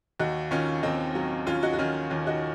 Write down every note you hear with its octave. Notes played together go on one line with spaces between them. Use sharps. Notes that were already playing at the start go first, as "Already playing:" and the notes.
D#2 D#4 F#4
D#3 C#4 F4
D#2 C4 D#4
F#3
D#2 C#4 F4
D#4 F#4
F#4
D#3 C#4 F4
D#2 C#4 F4
D#4 F#4